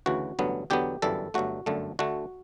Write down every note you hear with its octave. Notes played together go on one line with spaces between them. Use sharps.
D2 C#3 E3 F#4
A1 G2 D3 F#3 B3
E2 D3 F#3 B3 G4
G1 F#2 E3 G3 A4
G1 G2 F#3 A3 F#4
G1 F#2 D3 A3
D2 D3 A3 F#4